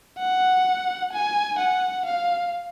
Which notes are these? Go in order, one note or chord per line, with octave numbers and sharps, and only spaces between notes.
F#5
G#5
F#5
F5